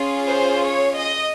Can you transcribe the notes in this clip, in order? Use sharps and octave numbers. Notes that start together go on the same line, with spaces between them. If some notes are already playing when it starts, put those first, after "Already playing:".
Already playing: C#4 F4 G#4
C5
C#5
D#5